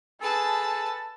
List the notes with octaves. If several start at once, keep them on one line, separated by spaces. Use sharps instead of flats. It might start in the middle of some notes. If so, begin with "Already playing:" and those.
G#4 A4 B4 A5